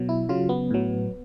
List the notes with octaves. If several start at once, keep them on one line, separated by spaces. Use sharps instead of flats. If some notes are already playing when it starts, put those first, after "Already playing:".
Already playing: B2 F#3
E4
C#3 F#3 F4
B3
A2 F#3